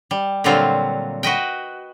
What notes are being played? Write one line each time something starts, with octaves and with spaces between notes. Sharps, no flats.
G3
A#2 D3 F#3 G3 C4 F4
F#4 B4 D#5 G5